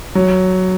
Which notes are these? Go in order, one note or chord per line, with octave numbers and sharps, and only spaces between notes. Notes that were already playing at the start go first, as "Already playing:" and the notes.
F#3